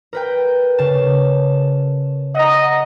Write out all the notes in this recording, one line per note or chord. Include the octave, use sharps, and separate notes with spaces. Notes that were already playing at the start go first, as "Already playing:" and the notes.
A#4 B4 G5
C#3 A5
D#5 F#5 A#5